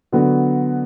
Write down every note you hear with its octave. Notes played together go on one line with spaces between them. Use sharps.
D3 F#3 B3 F#4